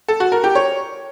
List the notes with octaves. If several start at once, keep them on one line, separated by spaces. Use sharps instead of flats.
A4
F#4
A#4
G4
C#5